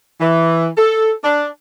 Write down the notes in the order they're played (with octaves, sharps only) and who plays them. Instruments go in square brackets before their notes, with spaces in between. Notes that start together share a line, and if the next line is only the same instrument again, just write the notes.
[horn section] E3
A4
D4